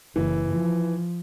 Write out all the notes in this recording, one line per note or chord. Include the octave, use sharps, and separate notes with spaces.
F#1 E3
F3